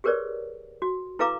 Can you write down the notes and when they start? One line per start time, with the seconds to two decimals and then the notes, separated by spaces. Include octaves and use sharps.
0.04 G4 G#4 A#4 B4 C#5 D5
0.82 F#4
1.19 E4 A4 B4 F5 A#5 D6